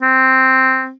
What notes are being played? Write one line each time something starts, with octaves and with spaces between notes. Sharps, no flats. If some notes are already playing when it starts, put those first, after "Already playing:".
C4